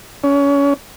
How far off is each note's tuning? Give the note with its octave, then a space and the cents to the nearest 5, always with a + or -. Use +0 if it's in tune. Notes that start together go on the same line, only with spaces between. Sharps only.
C#4 +25